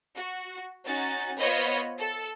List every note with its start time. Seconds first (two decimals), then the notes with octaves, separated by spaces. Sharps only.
0.15 F#4
0.85 C#4 D#4 F#4 A6
1.39 B3 F4 C5 C#5 D#5 B5
1.98 A4